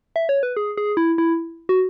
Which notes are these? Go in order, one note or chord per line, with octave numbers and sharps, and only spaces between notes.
E5
C#5
B4
G#4
G#4
E4
E4
F#4